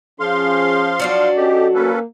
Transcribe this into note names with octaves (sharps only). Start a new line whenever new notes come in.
F3 C#4 G#4 F5 C6
F#3 D4 F#4
C#4 G4 A4 D#5
A#3 C#4 A4 B4